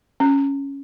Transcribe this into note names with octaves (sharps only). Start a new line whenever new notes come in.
C#4